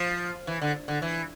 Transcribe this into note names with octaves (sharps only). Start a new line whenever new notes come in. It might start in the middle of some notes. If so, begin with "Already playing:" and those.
Already playing: F3
E3
D3
D3
E3